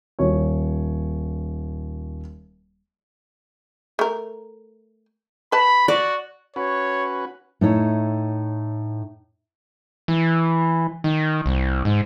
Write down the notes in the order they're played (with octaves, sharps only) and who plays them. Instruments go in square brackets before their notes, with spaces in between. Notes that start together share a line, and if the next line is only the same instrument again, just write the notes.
[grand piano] D#1 C#5
[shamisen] A3 A#4
[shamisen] B4 A5 [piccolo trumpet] B5
[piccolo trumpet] F#4 [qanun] D5
[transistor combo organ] C#4 F#4 B4 [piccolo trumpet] C#5
[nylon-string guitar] A2 D#4 C#5 E5
[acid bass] E3
D#3
C2
G#2